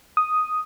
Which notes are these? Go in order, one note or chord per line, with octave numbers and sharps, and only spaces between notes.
D#6